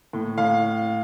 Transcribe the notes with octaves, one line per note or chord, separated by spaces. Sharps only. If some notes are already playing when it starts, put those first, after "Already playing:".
A2
A2 F5